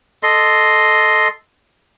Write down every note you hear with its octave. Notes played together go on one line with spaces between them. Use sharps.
A4 D#5 C6